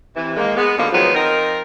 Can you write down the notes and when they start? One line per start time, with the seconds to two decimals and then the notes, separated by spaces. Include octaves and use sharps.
0.16 C3 E3
0.37 G#2 D#3 G#3 A#3
0.57 G#3 B3
0.78 B2 D3 D#3 F3 A#3
0.93 D#3 F3 F#3 G#3 B3
1.15 F3 C4 D#4 A#4